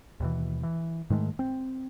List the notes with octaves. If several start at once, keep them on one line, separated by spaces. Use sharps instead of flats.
D#2 B2 E3
E3
G#2 D#3 G#3 A3
C4